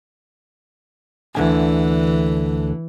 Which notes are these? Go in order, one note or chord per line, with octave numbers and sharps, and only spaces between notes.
D2 D3 E3 G#5